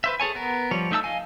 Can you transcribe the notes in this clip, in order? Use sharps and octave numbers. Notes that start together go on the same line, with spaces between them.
B4 C5 E5
G#4 A4 C#5 G#5
B3 A#4
F3 G3 C#5
A3 D#4 E5 A5 E6
D#5 F5 G#5